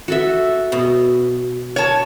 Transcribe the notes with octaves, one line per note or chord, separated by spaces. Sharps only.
F#4 A4 E5
B2
C#5 A5